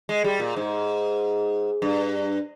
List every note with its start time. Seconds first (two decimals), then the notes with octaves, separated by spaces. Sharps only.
0.09 G#3
0.24 G3
0.40 A#2
0.56 G#2
1.82 G2